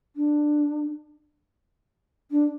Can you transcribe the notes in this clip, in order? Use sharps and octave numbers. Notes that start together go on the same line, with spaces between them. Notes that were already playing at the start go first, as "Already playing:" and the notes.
D4
D4